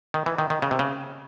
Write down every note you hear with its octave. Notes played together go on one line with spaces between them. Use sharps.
D#3
E3
D#3
D#3
C#3
C3
C#3